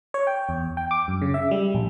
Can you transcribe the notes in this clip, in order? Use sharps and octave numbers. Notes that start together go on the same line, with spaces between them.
C#5
G5
E2
G5
D6
F#2
C#3
E5
G3
A#1